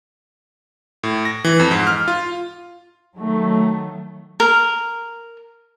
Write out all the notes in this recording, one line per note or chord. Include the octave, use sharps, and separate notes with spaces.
A2
A#6
E3
F2
G#2
F6
F4
D#3 F#3 A3
A#4